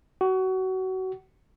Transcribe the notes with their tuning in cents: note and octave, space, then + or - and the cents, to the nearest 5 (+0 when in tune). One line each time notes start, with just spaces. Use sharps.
F#4 +25